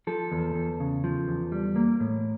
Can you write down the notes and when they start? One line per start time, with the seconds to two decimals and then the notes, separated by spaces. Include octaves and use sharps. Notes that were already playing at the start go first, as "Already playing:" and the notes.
0.07 F3 A4
0.32 E2
0.55 E2
0.80 C#3
1.04 F3
1.28 E2
1.52 G3
1.76 A#3
2.00 A2